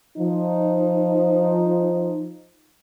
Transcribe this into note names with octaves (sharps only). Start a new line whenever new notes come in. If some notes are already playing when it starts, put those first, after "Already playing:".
F3 D#4